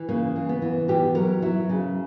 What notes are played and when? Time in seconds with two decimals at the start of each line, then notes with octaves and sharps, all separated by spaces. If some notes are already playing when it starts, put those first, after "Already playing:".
Already playing: E3
0.09 C#3 A#3
0.36 E3
0.49 B3
0.62 E3
0.88 B2 G4
1.15 F#3 A#4
1.42 F#3 E4
1.69 C#3